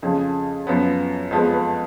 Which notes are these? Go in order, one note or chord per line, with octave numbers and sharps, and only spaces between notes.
F2 C#3 F3 G#4
F#2 F3 B3
F2 F3 G#3 B3
B4